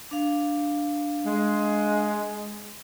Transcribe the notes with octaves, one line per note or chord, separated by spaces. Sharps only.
D4 F5
G#3